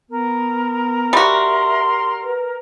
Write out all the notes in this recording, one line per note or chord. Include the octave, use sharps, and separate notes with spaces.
B3 A#4
G3 F#4 E5 C6
B4